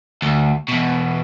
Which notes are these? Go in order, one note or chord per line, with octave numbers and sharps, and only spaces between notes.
D2
E2 B2